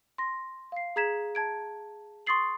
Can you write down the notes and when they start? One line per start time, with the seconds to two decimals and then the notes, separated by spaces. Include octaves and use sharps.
0.18 C6 A#6
0.72 F5 C7
0.96 G#4 A#5 G#6 B6 E7
1.35 A5 G#6 D7
2.27 C6 C#6 D#6 A6 C7 F#7